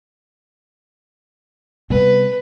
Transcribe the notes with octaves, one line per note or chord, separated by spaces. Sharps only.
C3 G3 B3 B4